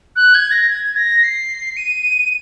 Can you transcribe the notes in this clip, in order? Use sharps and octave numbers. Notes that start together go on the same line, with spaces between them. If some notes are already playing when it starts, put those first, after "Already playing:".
F#6
G#6
A#6
G#6
A#6
C7
D#7